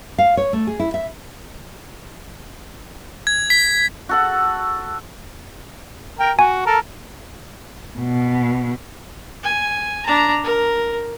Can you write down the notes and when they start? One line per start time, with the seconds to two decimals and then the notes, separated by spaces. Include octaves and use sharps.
0.18 F5
0.37 C#5
0.53 A3
0.67 G#4
0.80 E4
0.94 E5
3.27 G#6
3.50 B6
4.09 F#4 A4 F#5
6.19 A#4 G5
6.39 F#4 G#5
6.66 A4 A#4
7.99 B2
9.43 G#5
10.06 D4 A#5
10.44 A#4